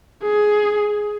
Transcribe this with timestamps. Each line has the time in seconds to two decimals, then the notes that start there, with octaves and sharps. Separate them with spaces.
0.23 G#4